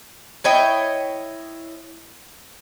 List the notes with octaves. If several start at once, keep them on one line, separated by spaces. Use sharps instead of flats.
E4 C#5 D#5 G5